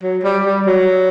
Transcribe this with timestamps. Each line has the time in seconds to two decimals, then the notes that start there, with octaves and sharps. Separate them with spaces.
0.03 F#3
0.23 G3
0.45 G3
0.66 F#3